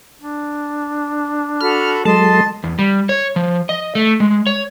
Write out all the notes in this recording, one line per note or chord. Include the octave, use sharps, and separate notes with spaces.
D4
F#4 A4 B5 F6
F#3 G#3 A4 D#5 A5 C6
E2
G3
C#5
F3
D#5
A3
G#3
C#5